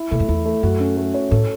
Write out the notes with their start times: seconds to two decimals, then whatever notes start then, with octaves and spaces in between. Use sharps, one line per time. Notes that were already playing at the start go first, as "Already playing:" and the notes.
Already playing: E4
0.11 B2 A3
0.20 F#2
0.28 E2 E4
0.45 A3
0.63 F#2 F#4
0.80 C#4
0.97 A3
1.14 C#5
1.31 A2 A4